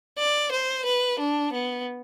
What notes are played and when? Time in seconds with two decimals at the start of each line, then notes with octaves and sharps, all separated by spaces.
0.19 D5
0.52 C5
0.85 B4
1.19 D4
1.53 B3